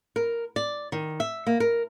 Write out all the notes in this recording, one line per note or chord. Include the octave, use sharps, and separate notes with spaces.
A#4
D5
D#3
E5
A#3
A#4